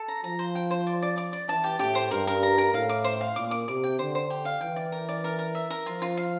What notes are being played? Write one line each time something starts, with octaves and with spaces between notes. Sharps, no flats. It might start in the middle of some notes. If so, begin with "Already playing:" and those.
Already playing: A4
A#5
F3 A#5
C5
G5
C5
D5
D5
D6
D5
E3 A5
G4
A2 G4
C5
G2 A#4
A#4
A#5
A#4
A2 F5
D6
C5
F5
A#2 D6
D6
C3 D6
G5
D3 C5
C5
G4
F5
E3 G5
D5
A#4
D5
A#4
A#4
E5
A#4
F3 F4
F4
F5